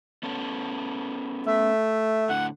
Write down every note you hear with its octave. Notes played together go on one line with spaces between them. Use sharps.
B3 C#4 A4
A3 E5
A2 D3 F#5